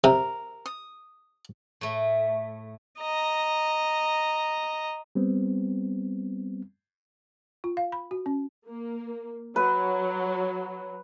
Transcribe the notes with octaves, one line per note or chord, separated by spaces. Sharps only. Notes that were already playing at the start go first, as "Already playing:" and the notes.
C3 A#4
D#6
A2 A3
D#5 A#5
G3 B3 C4
F4
F5
B5
F#4
C#4
A#3
F#3 B4